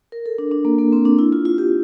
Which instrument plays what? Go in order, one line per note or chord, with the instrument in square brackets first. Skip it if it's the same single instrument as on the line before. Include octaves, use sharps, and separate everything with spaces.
[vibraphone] A#4
A4
D4
D4
A#3
A#3
C4
D4
E4
F4
F4
G4